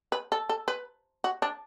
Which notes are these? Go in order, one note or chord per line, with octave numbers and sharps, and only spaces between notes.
B4
A4
A4
B4
F#4
D4